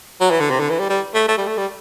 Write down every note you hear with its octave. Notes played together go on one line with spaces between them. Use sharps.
F#3
E3
D3
C3
D3
E3
G3
G3
A3
A3
G3
A3
G3